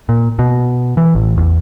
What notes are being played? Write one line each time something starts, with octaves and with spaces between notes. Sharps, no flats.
A#2
B2
E3
A1
E2